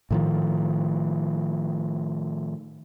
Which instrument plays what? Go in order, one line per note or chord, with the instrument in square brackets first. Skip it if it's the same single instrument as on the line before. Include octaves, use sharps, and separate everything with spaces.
[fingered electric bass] A2 D#3 F3